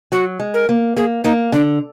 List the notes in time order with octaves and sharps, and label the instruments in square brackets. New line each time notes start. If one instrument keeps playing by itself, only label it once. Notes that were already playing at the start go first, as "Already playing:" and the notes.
[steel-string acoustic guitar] F#3 [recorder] F#4
[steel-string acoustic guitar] G#3
[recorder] A#4
[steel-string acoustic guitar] A#3
[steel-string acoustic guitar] A#3 [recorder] G#4
[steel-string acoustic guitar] A#3 [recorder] D#4
[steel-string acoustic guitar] D3 [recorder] D4